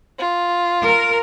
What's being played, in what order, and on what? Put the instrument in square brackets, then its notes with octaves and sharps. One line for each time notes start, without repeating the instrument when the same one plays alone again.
[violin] F4
[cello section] A#4